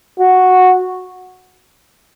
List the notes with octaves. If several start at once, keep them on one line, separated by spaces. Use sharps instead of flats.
F#4